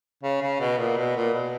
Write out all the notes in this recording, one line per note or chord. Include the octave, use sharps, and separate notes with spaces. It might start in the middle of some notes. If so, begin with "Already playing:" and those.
C#3
C#3
B2
A#2
B2
A#2
B2